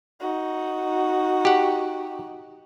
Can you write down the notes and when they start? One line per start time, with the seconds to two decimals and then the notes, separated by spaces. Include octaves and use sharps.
0.20 D#4 F#4
1.45 G4 F#5